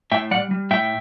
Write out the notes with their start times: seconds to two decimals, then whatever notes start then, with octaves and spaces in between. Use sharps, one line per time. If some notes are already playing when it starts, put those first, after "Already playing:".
0.12 A2 E5 G5
0.31 G3 D5 F#5
0.51 G3
0.71 A2 E5 G5